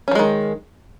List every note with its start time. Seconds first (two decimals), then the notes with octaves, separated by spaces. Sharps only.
0.08 C#4
0.11 F3
0.15 G#3
0.19 D#3